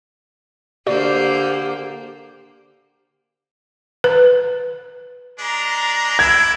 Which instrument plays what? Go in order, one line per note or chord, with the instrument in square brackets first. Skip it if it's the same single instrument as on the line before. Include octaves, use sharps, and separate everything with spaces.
[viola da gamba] D3 A#3 C5 [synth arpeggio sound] F#4 D5 [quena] G4
[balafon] B4
[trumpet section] G#3 D4 A#5
[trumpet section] D4 E4 [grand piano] G#6